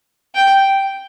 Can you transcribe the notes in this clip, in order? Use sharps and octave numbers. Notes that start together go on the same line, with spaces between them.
G5